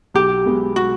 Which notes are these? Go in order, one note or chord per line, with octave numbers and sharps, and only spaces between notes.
B1 G4
B2 G#3 B3
F#4